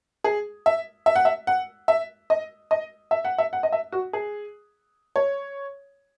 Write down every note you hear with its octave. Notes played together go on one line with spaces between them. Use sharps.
G#4
E5
E5
F#5
E5
F#5
E5
D#5
D#5
E5
F#5
E5
F#5
D#5
E5
F#4
G#4
C#5